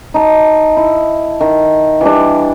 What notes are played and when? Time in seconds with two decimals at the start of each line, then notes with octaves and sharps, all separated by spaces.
0.14 D#4 A5
0.77 E4
1.41 D#3
2.01 E3 G3 D4